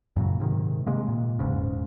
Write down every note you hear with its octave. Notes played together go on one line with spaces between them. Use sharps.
F#2 A#2 C#3 F#3
G#2 C3 D#3
C3 G#3 A#3
A#2
F1 E2 G#2 C#3